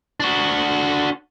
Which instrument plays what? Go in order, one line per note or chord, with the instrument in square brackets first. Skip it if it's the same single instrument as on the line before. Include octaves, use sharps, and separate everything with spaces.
[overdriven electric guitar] D4 F#4